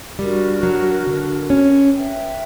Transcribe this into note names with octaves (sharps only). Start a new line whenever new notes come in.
G3 D4 F#4 A#4
F#3
D3
C#4
B4 E5 G5